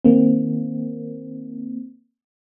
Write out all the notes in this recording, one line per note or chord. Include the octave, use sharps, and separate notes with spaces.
D#3 A#3 C4